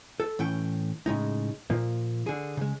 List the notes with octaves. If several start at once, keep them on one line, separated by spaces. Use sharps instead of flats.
A4
A2 E3 C#4 G5
A2 C#3 G#3 D#4
A#2 F3 A#3
D3 G#4
C#3 G#3